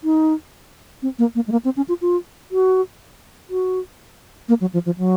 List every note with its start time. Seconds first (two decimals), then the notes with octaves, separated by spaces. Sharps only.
0.04 D#4
1.02 C4
1.19 A#3
1.35 A#3
1.48 G#3
1.52 A#3
1.65 C4
1.77 C#4
1.88 F4
2.02 F4
2.51 F#4
3.50 F#4
4.49 A#3
4.61 F#3
4.73 F3
4.86 F3
4.98 F#3